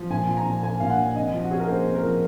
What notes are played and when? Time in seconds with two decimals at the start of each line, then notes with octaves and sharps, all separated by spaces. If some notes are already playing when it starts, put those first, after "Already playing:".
Already playing: F3
0.10 A#2 G#5
0.27 F3
0.37 A#5
0.46 A#2
0.63 A#3 G#5
0.80 A#2 F5
0.90 F#5
0.98 F3
1.16 C3 D#5
1.34 F3
1.43 F#4
1.51 C#4 G#4
1.60 A#4
1.68 A#3 C5
1.86 C3
1.95 A#4
2.04 F3